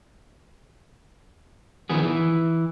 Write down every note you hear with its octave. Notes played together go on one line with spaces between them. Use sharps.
D#3 F3 B3 G#4
E3